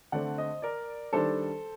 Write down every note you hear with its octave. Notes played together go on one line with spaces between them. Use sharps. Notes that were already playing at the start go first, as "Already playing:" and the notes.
D3 A3 C4 D5 F#5
C5 D#5
A#4 D5
D#3 G3 D4 A4 C5